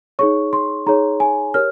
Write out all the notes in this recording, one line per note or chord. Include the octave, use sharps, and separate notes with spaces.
D#4 G#4 C#5 C#6
C6
D#4 G#4 C#5 A#5
G#5
G4 A#4 C#5 F6